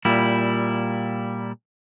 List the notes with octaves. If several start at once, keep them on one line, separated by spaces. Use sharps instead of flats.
A#2 G3 E4